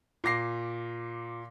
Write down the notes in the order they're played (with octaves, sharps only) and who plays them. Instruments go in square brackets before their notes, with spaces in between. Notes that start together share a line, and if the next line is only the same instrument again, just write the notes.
[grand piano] A#2 D6 A#6 C7